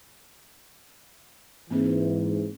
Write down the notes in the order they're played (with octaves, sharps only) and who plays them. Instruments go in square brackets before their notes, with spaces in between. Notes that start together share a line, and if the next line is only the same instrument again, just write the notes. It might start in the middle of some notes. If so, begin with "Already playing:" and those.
[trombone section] G#2 E3 [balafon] A#3 C4